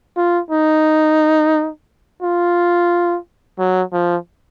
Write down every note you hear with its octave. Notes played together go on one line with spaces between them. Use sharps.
F4
D#4
F4
F#3
F3